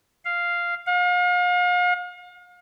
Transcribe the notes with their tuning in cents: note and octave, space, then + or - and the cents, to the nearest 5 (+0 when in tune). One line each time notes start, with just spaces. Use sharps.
F5 -5
F5 +40